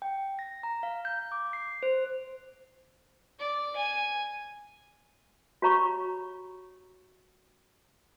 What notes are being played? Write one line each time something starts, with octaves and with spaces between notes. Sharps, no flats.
G5
A#6
A#5
F5
G6
D6
C7
C5
D5
G#5
F#4 G4 C#5 A#5 B5 C#6